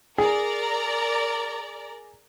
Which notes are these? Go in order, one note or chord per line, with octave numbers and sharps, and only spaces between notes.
G#4 A#4 D5 A#5